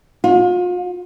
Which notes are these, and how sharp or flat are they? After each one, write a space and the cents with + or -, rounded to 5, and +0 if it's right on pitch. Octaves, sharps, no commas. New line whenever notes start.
F4 +40